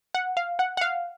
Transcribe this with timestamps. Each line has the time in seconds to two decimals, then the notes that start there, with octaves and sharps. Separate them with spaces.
0.14 F#5
0.37 F5
0.59 F#5
0.77 F#5
0.81 F5